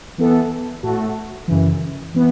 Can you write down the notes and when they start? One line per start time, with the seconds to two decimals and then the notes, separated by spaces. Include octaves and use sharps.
0.18 E3 B3 A4
0.83 A2 A3 F#4 A4
1.48 F#2 C#3 E3
2.14 E3 B3